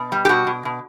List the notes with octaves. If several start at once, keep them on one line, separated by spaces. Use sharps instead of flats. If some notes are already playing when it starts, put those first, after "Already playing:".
Already playing: B2
G3
G4
B2 F#4
B2
B2